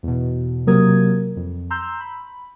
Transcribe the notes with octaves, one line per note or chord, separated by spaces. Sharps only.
E2 B2
C3 F#3 A#3 A#4 D#6 G#6
F2
A#5 C6 E6 G6
B5